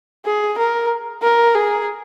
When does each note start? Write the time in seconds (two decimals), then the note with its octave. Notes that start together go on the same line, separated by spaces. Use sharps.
0.25 G#4
0.58 A#4
1.22 A#4
1.55 G#4